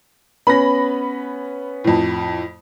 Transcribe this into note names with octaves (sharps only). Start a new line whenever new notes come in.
B3 C#4 B5 A#6
F2 A2